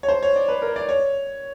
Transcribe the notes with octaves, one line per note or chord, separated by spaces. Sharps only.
C#5
C5
C#5
D5
B4
A#4
D5
C#5